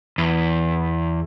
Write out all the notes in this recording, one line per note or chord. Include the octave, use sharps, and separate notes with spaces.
E2